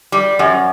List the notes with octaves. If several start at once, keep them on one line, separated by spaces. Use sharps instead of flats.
G3
F#2